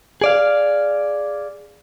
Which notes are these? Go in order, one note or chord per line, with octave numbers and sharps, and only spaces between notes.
G#4 D5 F5